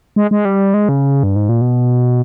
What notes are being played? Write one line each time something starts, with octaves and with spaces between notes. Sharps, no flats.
G#3
G#3
G3
G#3
C#3
G2
G#2
A#2
B2